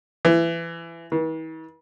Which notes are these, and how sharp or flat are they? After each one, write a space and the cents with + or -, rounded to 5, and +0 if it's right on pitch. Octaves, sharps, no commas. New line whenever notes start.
E3 +20
E3 -45